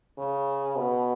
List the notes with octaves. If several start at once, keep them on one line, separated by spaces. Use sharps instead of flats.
C#3
B2